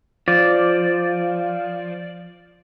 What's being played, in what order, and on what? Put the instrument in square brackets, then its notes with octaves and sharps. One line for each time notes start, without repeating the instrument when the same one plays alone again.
[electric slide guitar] F3 [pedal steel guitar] D5